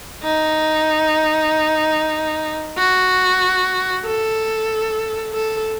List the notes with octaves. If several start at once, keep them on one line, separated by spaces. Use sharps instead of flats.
D#4
F#4
A4
A4